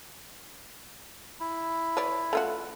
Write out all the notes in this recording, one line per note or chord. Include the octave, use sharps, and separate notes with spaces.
E4
B4 C#5 D5
A3 F4 F#4